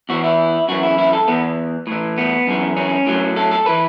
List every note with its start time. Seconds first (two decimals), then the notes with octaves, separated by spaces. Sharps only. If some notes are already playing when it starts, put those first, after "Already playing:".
0.09 E2 E3 F#4
0.24 E4
0.68 F#2 E3 F#4
0.83 E4
0.98 E4
1.13 A4
1.28 E2 E3 B3
1.87 A2 E3
2.18 B3
2.47 F#2 E3
2.77 C#4
3.07 A2 F#3
3.36 A4
3.51 A4
3.66 E3 B4